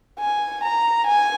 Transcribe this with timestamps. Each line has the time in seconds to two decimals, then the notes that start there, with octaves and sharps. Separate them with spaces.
0.19 G#5
0.64 A#5
1.07 G#5